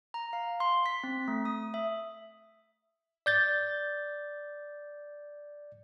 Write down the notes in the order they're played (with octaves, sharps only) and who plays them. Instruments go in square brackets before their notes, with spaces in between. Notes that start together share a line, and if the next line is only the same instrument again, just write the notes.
[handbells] A#5
F5
C6
B6
C4
A3
D#6
E5
[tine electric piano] D5 G6 A6